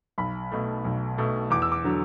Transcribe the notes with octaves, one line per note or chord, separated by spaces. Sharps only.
B1 B5
B2 A3
B1
B2 A3
E2 D6
E6
D6
D3 F#3